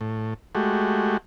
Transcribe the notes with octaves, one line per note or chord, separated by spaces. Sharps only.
A2
G#3 A3 F#4 G4